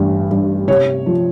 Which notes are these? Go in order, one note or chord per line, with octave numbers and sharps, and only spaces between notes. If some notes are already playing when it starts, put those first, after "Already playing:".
Already playing: A1 G2
G2
C3 C#5
F3